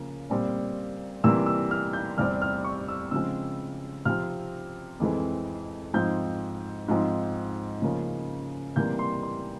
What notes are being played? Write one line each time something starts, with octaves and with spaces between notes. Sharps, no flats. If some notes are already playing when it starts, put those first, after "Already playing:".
Already playing: C#3 F3 A#3
A#2 G3 C4
C3 E3 G3 A#3 E6
E6
F6
G6
E2 C3 G3 C4 F6
F6
C#6
E6
C#3 F3 G#3 C4 E6
C3 F3 C4 F6
F2 E3 G#3 C4
G#2 F3 C4 G6
G#2 F3 C4
C#3 F3 A#3 C#4
C3 E3 G3 A#3 G6
C6
C6